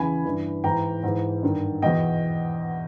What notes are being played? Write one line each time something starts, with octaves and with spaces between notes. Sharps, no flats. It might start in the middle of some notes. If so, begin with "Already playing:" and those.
Already playing: E2 C#3 E3 G#5 B5
G2 E3
G#2 E3 G5 A#5
G#2 E3
G2 D#3
E2 B2 D#5 G5